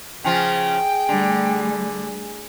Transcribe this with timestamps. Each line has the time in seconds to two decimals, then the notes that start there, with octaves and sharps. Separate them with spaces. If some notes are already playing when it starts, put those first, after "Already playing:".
0.24 C#3 F3 F4 G#4 G5
1.09 D3 G3 A3